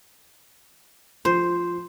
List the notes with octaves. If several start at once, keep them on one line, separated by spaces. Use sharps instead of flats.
F3 C5